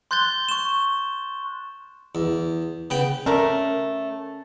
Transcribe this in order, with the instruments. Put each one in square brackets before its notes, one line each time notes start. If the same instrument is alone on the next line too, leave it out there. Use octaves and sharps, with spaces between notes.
[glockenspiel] C6 F#6 G6 A6 G7
C#6 E7
[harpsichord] E2
C#3 B3 G5
[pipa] A3 A#4 D5 [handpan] C#4